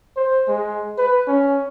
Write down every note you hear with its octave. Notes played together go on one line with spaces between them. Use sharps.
C5
G#3
B4
C#4